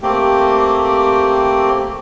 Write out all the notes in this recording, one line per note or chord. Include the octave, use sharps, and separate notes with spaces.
A3 A#3 C4 G4